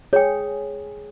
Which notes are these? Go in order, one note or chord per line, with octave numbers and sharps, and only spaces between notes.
G#4 C#5 G5